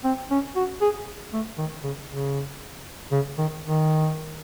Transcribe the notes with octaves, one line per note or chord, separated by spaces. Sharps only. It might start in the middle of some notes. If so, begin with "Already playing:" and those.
C4
C#4
F#4
G#4
A3
D#3
C#3
C#3
C#3
D#3
D#3